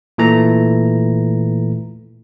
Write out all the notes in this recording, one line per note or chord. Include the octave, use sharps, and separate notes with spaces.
A#2 E3 A3 A#5